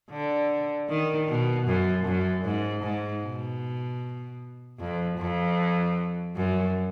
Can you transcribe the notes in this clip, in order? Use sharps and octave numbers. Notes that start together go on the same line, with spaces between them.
D3
D#3
B2
F#2
F#2
G#2
G#2
B2
F2
F2
F#2